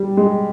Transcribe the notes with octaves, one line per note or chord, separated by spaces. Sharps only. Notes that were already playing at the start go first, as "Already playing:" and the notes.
Already playing: G3
G#3